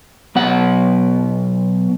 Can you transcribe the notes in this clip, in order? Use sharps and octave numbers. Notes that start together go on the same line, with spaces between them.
B1 B2 F#5